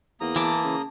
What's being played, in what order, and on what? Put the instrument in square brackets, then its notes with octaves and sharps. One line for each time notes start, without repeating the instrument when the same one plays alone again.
[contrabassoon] E2 [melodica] A#3 A#5 D#6
[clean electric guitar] E3 [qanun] A5 D6
[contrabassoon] C#3